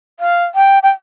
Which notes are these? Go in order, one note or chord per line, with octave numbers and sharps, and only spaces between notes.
F5
G5
G5